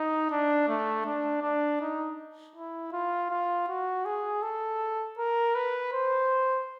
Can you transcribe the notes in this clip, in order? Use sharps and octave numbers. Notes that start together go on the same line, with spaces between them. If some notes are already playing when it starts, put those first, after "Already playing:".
Already playing: D#4
D4
A3
D4
D4
D#4
E4
F4
F4
F#4
G#4
A4
A#4
B4
C5